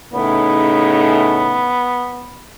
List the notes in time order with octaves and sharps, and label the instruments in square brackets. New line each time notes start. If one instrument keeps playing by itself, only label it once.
[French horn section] A2 C#3 D#4 [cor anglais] B3